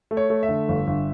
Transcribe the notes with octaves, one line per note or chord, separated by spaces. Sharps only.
A3
C#5
A3
E5
D3
G1
G1